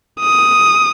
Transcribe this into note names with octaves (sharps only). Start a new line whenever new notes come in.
D#6